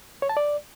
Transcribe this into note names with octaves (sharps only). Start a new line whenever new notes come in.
C#5
A5
D5